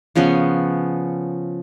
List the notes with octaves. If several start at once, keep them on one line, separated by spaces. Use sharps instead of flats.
C#3 F3 B3 C#4